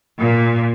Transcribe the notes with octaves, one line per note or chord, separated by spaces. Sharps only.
A#2